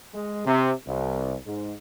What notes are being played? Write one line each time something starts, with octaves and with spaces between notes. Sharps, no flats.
G#3
C3
C2
G#2